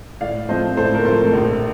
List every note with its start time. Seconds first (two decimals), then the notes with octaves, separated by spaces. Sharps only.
0.21 A2 D5 F5
0.49 F3 A3 C4 C5 D#5
0.77 A2 A4 C5
0.94 A#4
1.04 F3 A3 C4 A4 C5
1.33 A#1